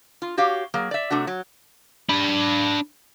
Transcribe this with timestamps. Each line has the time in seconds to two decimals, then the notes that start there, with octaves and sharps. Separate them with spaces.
0.22 F4
0.37 F#4 G4 C#5 F5
0.74 F#3 A#3 G#4
0.91 D5 E5
1.10 C3 A3 D4 F#4
1.27 F#3
2.10 D4 B5